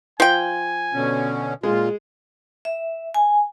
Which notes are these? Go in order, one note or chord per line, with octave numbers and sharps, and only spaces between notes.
F3 G5 G#5
B2 D3 C#4
A#2 G#3 F4
E5
G#5